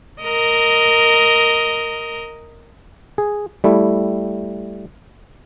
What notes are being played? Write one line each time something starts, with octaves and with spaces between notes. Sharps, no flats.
A#4 D#5
G#4
G3 A3 E4